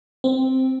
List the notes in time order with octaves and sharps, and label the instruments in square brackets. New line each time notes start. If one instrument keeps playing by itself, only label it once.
[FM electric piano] C4